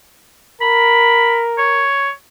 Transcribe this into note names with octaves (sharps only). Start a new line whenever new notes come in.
A#4 B5
C#5